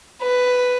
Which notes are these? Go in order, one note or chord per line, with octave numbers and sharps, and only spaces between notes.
B4